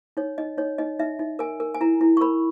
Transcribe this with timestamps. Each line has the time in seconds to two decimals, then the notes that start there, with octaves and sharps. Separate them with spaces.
0.17 D#4 C#5
0.38 D#4 D#5
0.58 D#4 C#5
0.78 D#4 D#5
0.99 D#4 E5
1.19 D#4
1.39 A#4 G#5
1.60 A#4
1.74 G#5
1.81 E4 A#5
2.01 E4
2.17 C#6
2.21 A#4 B5